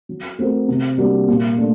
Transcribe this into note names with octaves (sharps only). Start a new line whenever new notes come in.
F#3
A3 C4 F#4 A#4
C3
G3 A#3 D4 F#4
A#2
A3 D4